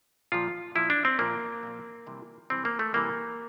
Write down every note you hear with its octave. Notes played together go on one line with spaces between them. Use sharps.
A#2 F3 F4
A#2 F3 E4
D4
C4
A#2 F3 A#3
A#2 F3
C3 E3 G3
C3 E3 G3 C4
A#3
A3
C3 E3 G3 A#3